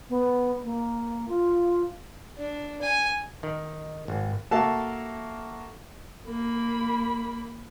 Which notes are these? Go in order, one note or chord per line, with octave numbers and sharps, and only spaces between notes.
B3
A#3
F4
D4
G#5
D#3
G#1
A#3 F#4 A4 E5 F5 A5
A#3 B5